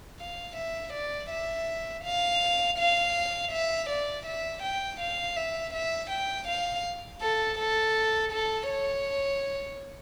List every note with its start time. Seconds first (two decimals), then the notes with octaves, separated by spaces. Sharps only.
0.20 F5
0.56 E5
0.93 D5
1.30 E5
2.04 F5
2.78 F5
3.52 E5
3.89 D5
4.26 E5
4.62 G5
5.00 F5
5.37 E5
5.73 E5
6.10 G5
6.48 F5
7.21 A4
7.58 A4
8.32 A4
8.69 C#5